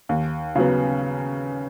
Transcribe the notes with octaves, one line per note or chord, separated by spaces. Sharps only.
D#2
C#3 F#3 B3